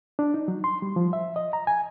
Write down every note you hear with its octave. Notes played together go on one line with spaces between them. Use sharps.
D4
D#4
F#3
C6
G3
F3
E5
D#5
A#5
G#5